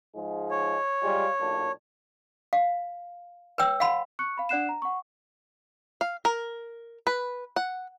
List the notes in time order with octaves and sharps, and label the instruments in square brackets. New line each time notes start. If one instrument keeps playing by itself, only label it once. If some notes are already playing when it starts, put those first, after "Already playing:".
[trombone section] G#2 F3 G#3
[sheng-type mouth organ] C#5
[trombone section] G3 G#3 F4
B1 A#2 D4
[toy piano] F5
B4 C#5 G5 E6
F5 F#5 B5 C6
[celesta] C#6 F#6 C#7
F5 B5
D4 D5 F#5 F#6 C7 E7
A#5
F#5 C#6
[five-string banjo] F5
A#4
B4
F#5